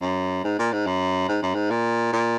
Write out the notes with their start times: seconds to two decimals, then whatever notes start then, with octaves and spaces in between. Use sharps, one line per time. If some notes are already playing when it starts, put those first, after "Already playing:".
0.02 F#2
0.45 G#2
0.59 A#2
0.72 G#2
0.86 F#2
1.29 G#2
1.43 F#2
1.55 G#2
1.71 A#2
2.13 A#2